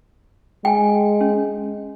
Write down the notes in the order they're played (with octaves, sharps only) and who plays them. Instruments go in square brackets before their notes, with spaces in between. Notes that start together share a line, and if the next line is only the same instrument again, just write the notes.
[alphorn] G#3 [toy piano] G5 G#5
[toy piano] C#4